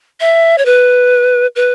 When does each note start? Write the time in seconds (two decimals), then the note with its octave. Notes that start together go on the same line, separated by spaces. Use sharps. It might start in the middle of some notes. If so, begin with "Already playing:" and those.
0.20 E5
0.58 C#5
0.66 B4
1.56 B4